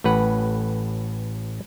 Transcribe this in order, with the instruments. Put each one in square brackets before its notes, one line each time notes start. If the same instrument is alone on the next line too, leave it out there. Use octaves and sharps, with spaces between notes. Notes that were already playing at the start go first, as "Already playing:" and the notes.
[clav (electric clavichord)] A1 A2 B4 F#5